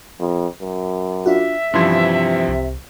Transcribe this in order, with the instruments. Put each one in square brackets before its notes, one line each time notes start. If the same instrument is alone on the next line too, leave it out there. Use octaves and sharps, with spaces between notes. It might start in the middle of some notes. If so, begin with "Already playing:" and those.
[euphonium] F2
F#2
[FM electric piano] D4 F4 F#4 [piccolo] E5
[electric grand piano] G2 E3 F3 [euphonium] C3 [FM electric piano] C#4 C6 G#6
[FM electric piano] C2